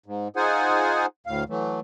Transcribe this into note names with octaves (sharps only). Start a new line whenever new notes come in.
G#2
D#4 F4 G#4 C5 F#5 G#5
D2 A2 F5
E3 F#3 A3